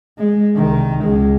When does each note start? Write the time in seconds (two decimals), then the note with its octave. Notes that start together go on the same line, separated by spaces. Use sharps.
0.18 G#3
0.56 C2 D#3
1.03 C#2 G#3